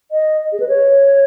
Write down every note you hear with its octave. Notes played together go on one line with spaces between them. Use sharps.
D#5
G#4
B4
C#5